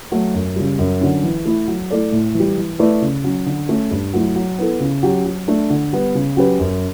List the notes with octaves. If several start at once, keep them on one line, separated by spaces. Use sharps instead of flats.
F#3 A3
F#2
C#3 G3
F#2
D3 F#3 C#4
E3
A3 E4
F#3
A3 E4 A4 D5
A2
E3
G3
E3
A3 E4 B4 D5
C#3
F#3 C#4
D3
A3 C#4
G2
F#3 A3 E4
F#3
B3 E4 A4
C#3
F#3 C#4 G4
F#3
A3 D4
D3
G3 B3
C#3
F#3 C#4 G4 B4
F#2